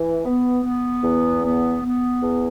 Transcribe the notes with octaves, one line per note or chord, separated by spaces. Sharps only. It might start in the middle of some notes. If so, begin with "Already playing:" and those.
Already playing: E3
B3
B3
E2
B3
B3
E2